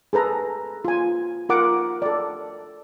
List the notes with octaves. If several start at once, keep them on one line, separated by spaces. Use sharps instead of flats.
G#4 A4 B4 A#5
F4 G#5
F4 A#4 F#5 D6
A4 D5